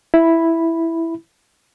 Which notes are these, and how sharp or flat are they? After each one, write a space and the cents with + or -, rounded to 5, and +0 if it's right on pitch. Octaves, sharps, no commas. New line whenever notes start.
E4 +0 B5 +0